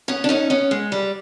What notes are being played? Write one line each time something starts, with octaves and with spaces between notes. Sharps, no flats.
B3 C#4
D4
C#4 D#4
B3 C#4
G#3
G3